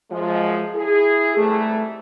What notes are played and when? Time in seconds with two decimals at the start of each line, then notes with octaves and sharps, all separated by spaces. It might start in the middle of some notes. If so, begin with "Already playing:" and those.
0.11 F#2 F3 G#3
0.75 E4 G#4
1.37 G#2 C3 E3 G3 A3